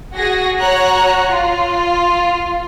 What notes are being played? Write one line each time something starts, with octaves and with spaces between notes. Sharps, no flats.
F#4 G#4 A#6
F#4 C#5 A#5 F#6
F4